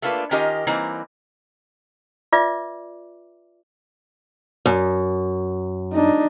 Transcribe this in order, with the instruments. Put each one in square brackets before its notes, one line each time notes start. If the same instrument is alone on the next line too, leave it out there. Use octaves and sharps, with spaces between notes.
[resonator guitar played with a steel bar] A3 A#3 D4 F4 B4
D#3 C#4 F4 G4 A#4 D#5
E3 G3 A#3 C4 D#4
[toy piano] F4 B4 D5 E5 D6
[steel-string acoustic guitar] F#2
[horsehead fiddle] D4 D#4